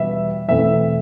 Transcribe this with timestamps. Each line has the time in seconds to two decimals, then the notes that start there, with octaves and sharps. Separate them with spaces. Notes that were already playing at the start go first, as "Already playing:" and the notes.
Already playing: E2 B2 G3 E5
0.48 E2 B2 A3 C4 E4 E5